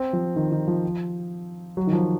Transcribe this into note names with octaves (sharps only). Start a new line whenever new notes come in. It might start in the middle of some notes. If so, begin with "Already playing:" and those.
Already playing: C4
F3
D#3
D#3
F3
F#3
D#3
F3